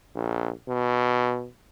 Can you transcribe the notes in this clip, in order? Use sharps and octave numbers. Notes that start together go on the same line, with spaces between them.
A#1
B2